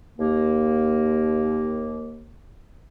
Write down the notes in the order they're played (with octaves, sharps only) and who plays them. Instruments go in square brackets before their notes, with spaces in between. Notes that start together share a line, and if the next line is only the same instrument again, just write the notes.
[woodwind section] D#2 A#3